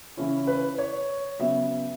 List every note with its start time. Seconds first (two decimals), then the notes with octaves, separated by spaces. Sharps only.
0.17 C#3 E3 C#4 E4
0.47 B4
0.78 C#5
1.39 C#3 F#3 B3 E5